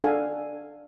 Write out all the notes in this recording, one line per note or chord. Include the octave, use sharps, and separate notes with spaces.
D4 A4 F5 F#5 G#5